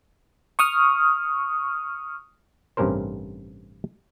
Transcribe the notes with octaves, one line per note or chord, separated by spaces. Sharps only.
C#6 D#6 F6
A1 G2 C3 C#4 A#4 C5